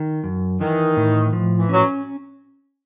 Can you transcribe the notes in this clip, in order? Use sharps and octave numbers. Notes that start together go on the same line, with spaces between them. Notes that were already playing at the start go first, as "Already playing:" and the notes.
Already playing: D#3
F#2
D#3 E3
A2
F3
E3
F#3 C#4